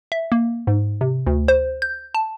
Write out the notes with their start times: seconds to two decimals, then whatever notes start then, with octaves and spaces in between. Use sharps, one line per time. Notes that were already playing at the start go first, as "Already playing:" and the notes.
0.12 E5
0.32 A#3
0.67 G#2
1.01 C3
1.27 D2
1.48 C5
1.82 G6
2.15 A5